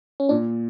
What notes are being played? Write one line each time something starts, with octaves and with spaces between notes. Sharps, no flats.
C#4
A#2 D4